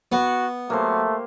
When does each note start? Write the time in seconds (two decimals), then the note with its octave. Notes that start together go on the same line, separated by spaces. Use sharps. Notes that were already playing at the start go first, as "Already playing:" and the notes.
0.12 B3 F#4
0.70 F#3 A3 A#3 G4 C5